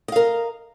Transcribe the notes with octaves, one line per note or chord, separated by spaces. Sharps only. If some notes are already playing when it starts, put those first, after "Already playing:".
A#4 D#5 F5